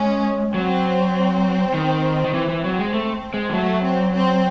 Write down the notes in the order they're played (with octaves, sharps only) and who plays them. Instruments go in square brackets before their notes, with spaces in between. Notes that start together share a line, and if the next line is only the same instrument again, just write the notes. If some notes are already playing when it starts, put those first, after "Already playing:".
Already playing: [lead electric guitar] G#3 [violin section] C#4
[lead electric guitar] F#3 [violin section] C4
[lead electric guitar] D#3
D#3
[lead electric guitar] E3 [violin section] C4
[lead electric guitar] E3
[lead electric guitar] F#3 [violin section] C4
[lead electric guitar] G#3
A3
G#3
E3
[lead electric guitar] F#3 [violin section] A3
[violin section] C4
C4